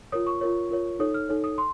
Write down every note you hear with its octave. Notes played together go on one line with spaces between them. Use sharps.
F4 A#4 C#5 D#6
C#6
F4 A#4 C#5
F4 A#4 C#5
D#4 A4 C#5 D#6
F6
D#4 A4 C#5
D#6
C6